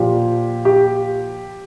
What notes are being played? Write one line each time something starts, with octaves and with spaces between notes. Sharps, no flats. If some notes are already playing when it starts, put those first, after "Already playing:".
Already playing: A#2 F3 G4
G4